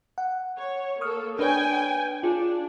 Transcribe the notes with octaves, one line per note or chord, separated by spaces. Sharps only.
F#5
C#5
A#3 A4 C#6 D#6 F6
D4 B4 C#5 G5 G#5
D4 F4 G#4